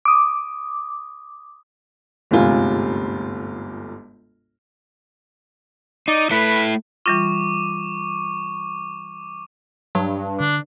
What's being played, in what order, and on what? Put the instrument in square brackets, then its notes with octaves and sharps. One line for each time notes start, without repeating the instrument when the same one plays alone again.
[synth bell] D6 D#6
[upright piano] G1 D2 G#2 C3 F4 G#5
[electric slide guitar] D#4 [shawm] D5
[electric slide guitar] A3 E4 A4 [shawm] B4
[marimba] E3 G3 F4 [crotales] C#6 D6 D#7
[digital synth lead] G2 [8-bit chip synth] F#3
[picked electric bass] D3 [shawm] D4